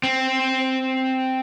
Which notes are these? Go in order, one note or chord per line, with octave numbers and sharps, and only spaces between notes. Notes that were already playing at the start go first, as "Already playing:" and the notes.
C4